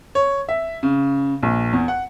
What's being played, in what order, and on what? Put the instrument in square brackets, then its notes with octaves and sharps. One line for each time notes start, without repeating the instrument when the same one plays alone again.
[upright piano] C#5
E5
C#3
A#1
E2
F#5